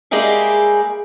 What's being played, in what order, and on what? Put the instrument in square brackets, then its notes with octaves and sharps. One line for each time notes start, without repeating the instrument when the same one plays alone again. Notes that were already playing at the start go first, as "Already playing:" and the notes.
[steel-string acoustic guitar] G3 G#3 A#3 G4 G#4 E5